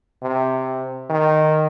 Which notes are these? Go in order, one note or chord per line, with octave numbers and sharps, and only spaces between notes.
C3
D#3